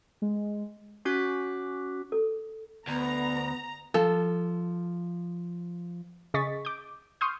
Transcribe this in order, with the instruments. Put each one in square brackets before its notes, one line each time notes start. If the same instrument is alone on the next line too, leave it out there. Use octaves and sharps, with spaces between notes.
[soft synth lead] G#3
[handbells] C#4 F#4 D6 F#6 B6
[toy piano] A4
[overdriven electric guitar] D2 [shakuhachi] B3 [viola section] A#5
[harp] F3 [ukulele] A4
[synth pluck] C#3 G#4 D#5 C#6 A6 B6
D6 G6
C6 C#6 D#6 F6 G6